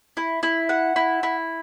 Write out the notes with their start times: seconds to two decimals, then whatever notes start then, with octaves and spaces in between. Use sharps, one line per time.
0.17 E4
0.43 E4
0.69 F#5
0.96 E4
1.23 E4